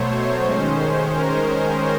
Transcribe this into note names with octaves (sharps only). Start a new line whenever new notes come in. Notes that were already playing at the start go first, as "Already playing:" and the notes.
Already playing: B2 F#3 A3 C5 C#5
D#3 G#3 C#4
A#4